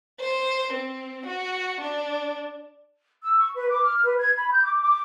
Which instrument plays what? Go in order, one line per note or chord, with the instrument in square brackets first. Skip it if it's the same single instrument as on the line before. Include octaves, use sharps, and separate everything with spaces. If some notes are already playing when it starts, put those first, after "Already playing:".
[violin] C5
C4
F#4
D4
[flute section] E6
C#6
B4
D6
F6
B4
G#6
B5
G6
D6
D6